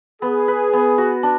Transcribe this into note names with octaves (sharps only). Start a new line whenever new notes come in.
B3 G#4
B4
B3
F#4
D4